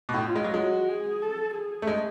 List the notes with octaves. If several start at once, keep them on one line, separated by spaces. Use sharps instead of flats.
B2
A2
F4
G#3
F#3
G#3 F#4
G#4
A4
G#4
A3
G#3